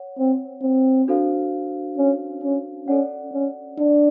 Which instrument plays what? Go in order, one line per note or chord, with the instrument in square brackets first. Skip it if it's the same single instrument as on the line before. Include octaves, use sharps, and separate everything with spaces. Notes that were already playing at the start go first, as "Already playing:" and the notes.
Already playing: [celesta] C#5 F#5
[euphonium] C4
C4
[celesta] D4 F#4 A4 C5 F5
[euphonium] C#4
C#4
[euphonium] C#4 [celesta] A4 D5 F#5
[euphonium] C#4
D4